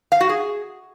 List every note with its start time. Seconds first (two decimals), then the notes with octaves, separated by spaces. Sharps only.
0.12 F5
0.21 F#4
0.29 G#4